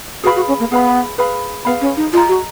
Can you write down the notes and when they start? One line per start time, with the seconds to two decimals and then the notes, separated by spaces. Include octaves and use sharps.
0.24 F#4 G#4 B4 F5 B5
0.36 F#4
0.48 C#4
0.60 A#3
0.71 B3 G#4 B4 F5 B5
1.18 G#4 B4 F5 B5
1.65 B3 G#4 B4 F5 B5
1.81 C#4
1.97 D#4
2.13 F4 G#4 D#5 A#5
2.28 F#4